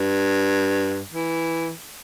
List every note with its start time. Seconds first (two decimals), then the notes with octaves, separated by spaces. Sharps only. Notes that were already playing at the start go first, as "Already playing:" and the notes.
Already playing: G2
1.14 E3